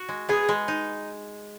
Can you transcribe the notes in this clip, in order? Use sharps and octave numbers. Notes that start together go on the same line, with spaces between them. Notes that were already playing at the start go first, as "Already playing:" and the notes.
Already playing: F#4
G#3
B3 G#4
G#3
D#4